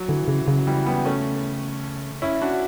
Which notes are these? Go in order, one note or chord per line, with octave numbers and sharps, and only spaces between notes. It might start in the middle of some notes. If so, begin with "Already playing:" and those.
Already playing: F#3
D3 E3
C#3 E3
C#3 F#3
E3 G3
G3 B3
A3 C#4
C#4 E4
D4 F#4